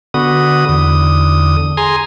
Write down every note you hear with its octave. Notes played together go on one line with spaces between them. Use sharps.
D3 B3 F#4 D#6
E2 D3 D#6
G#4 G#5 A#5 C6